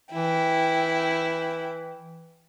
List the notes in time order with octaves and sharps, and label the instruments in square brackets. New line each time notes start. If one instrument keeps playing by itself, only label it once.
[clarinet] E3 [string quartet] E4 G5